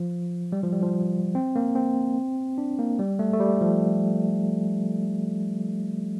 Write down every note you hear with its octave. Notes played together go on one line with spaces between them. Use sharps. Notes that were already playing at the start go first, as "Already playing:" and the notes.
Already playing: F3
G3
F3
G3
F3
C4
A#3
C4
D4
A#3
G3
A3
A3
G3
F3